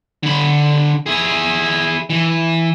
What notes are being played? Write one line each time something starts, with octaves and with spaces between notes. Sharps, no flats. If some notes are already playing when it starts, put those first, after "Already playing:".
D3 B5
E4 G#4
E3